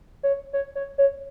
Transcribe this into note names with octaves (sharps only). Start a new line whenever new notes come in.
C#5
C#5
C#5
C#5